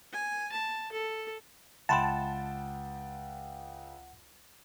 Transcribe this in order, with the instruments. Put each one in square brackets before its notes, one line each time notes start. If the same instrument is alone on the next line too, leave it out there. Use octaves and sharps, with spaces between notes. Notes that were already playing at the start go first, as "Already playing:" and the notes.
[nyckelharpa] G#5
A5
A4
[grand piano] C#2 G5 A6 [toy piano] E5 B5 C6 [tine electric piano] F#5 [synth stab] A5